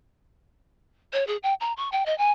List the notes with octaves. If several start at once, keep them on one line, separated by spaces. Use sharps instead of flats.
C#5
G#4
G5
A#5
C#6
G5
D#5
G#5